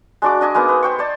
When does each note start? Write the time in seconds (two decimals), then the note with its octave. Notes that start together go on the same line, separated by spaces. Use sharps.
0.22 G#3 D4 F#4 D6
0.41 D4 D#5 G#5 D6
0.54 G#3 A#3 B3 D#4
0.69 B3
0.83 C5 G5 C#6
0.99 C5 D5 A5